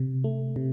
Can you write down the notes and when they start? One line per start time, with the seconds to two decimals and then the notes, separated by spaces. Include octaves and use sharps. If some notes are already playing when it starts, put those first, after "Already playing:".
Already playing: C3
0.24 A3
0.56 C3